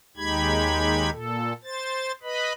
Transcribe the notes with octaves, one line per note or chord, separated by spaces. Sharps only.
D#2 G#3 D#4 G4 B5 G#6
A#2 A4
C5 A6
B4 D#5 B5